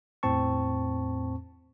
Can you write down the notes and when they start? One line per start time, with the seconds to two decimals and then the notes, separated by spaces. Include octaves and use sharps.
0.23 E2 A2 C4 A5 C#6